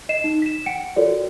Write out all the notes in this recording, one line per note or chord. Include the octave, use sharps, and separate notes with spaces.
D#5 C7 E7
D#4
B6 E7
F#5 G5 C#7 D7
F4 F#4 A4 A#4 C#5 D5